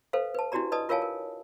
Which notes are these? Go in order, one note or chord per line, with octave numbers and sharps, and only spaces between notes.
A4 B4 C5 F5
B4 A5
D4 E4 F#4 G4 D5 A#5
B4 D5 D#5 A5 D#6
F4 A#4 C#5 F5 G#5 A5
A#4